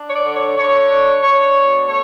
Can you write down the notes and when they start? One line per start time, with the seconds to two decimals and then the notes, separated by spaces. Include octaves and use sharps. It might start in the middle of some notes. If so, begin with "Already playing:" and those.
Already playing: D4
0.08 C#5
0.14 D5
0.25 D3
0.35 C#5
0.57 D3 C#5
0.89 D4
1.22 D4 C#5
1.54 B2
1.87 A3 C#5